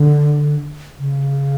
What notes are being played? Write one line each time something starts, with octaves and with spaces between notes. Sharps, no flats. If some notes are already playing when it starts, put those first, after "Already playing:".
Already playing: D3
C#3